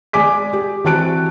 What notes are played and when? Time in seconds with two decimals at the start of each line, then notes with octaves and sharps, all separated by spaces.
0.13 G#3 D5 G#5 D6 B6
0.53 G4
0.84 E3 C4 F#4 A5 F#6 D7